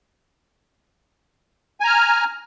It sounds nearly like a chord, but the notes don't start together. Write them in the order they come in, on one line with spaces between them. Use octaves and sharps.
G#5 A#5 F6